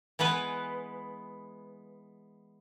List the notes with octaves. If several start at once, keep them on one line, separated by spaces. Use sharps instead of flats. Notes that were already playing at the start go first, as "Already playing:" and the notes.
E3 G#3 B3 B4